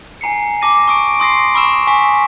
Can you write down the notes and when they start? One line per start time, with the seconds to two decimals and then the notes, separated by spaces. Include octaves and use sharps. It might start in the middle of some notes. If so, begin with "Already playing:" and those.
0.21 G#5 A#5 C7 C#7
0.61 A5 D6 A#6 D#7
0.88 C#6 D#6 D7
1.20 C6 D#6 A#6 C7
1.54 B5 C#6 E6 E7
1.87 G#5 C#6 D#6 B6